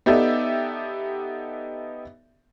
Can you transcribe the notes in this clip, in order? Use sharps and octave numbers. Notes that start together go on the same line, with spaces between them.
B3 D#4 G4 A4 D5 E5